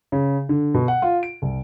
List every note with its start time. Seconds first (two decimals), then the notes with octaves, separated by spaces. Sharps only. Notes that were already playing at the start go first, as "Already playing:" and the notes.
0.12 C#3
0.49 D3
0.74 B2
0.88 F#5
1.02 F4
1.23 D7
1.42 C2